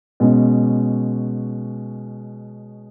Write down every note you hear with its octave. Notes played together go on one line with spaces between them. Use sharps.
B2 G#3 C#4